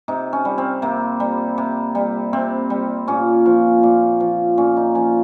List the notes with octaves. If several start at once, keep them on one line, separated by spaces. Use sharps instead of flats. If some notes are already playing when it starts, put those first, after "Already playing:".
C3 D#4
C#4
G3
C4
C3 A#3
G3
C3
G3
C3 C4
G3
A#2 C#4
F3
A#2
F3
A#2 C#4
D#4
F3 C#4